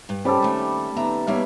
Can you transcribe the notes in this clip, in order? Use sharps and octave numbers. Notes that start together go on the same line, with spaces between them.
G2
G3 C4 C#4 A4 C5
D#2 A3
D#2 B3 E5 A#5
G3 A#3 B3 D#4 C#5 E5